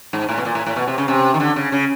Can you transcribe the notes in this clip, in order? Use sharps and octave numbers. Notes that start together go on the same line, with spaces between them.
G#2
A2
B2
A#2
A2
A2
B2
C3
C#3
C3
D#3
D3
C#3
C#3